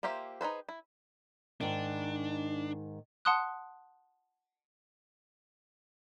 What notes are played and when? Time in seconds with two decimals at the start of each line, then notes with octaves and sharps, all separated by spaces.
0.03 A#3 F4 G4 C5 E5
0.41 D#4 G#4 B4 C5
0.69 E4
1.61 G#2 D#3 D4
3.25 F#5 A5 C6 D#6 F#6